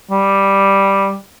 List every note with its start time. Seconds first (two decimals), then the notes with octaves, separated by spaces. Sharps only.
0.10 G3